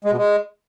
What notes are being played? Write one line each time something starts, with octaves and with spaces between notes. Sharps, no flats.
G#3
B2
G#3